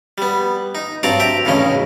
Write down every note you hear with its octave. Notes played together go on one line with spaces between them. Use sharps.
G3 B3
D#4
G2 F#3 C4 D5 A#5
E5 G5 A#5
B1 E2 A2 C#3 C#4 D#5